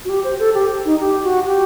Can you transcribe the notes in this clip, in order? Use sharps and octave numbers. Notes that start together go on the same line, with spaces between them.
F#4
G4
C5
A4
G4
D#4
G4
F#4
G4